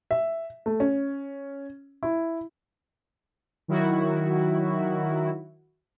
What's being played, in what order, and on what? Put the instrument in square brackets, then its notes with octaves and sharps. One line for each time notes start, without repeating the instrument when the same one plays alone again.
[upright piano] E5
A3
C#4
E4
[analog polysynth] D#3 F#3 E4 F#4